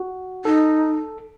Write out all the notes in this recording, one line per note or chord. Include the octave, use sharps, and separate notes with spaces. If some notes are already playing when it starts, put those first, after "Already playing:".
Already playing: F#4
D#4 A4